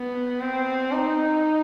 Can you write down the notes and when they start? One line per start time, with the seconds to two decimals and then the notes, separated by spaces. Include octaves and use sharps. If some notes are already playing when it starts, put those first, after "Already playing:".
Already playing: B3
0.41 C4
0.92 D#4